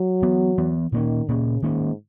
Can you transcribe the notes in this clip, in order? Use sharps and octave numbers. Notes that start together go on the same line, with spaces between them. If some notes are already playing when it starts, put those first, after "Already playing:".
Already playing: F#3
E3 B3
E3 B3
A#2 D#3 A#3 C#4
A#2 C#3 A#3 C#4
G#2 D#3 A#3 C#4